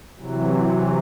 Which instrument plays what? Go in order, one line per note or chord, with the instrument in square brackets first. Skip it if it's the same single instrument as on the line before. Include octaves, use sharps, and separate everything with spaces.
[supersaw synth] C3 E3 F#3